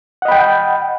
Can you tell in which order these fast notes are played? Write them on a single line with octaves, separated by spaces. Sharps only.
F#5 D#5 B5 G5